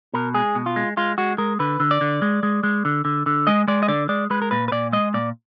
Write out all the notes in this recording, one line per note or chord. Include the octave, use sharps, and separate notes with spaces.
B2 A#4
G#3 G#4
B2
F4
G#3
G#3 F4
G#3 F#4
G#3 A#4
D3 B4
D3
D5
D3
G#3
G#3
G#3
D3
D3
D3
G#3 D#5
G#3 D5
D#5
D3 D5
G#3 D5
G#3 B4
A#4
A#2 B4
B4
A#2 D5
G#3 D#5
A#2 D5